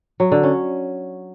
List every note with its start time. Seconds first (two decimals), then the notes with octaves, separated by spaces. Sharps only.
0.20 F#3
0.32 D3
0.43 C#4